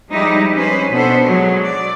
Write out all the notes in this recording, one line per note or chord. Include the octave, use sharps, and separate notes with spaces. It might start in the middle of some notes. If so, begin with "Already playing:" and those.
F3 G3 G#3 D#4 E4 G4
C#4 B4 C5
B2 B3 D4 A4 C5
F#3 G#3
D5